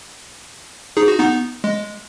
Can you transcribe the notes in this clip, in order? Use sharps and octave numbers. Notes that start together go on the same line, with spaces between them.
D#4 G#4
F#4
B3 D#4
G#3